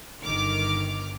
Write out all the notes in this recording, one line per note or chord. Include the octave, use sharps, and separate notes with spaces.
G1 D#3 D6 F6